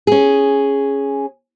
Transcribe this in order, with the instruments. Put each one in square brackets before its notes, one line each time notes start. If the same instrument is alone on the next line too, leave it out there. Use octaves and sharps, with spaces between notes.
[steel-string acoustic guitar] C#4 G#4